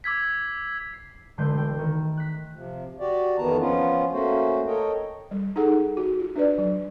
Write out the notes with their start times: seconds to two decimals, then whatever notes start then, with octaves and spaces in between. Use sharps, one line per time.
0.04 D6 E6 G#6 B6
0.93 C7
1.38 E1 D3 G#3 A3 C5 G6
1.57 G5
1.79 D#3
2.17 F#6 B6
2.55 C3 F3
3.00 F#4 G4 D5
3.38 F2 D#3 E3 B3 A5 A#5
3.59 F3 B3 C#4 F4
4.12 A3 A#3 C#4 F#4 C5
4.67 A4 A#4 C#5 D#5 G5
5.31 G3
5.56 D#4 G#4 A4 F#5
5.97 F#4
6.19 F4
6.36 D4 B4 D5
6.58 F#3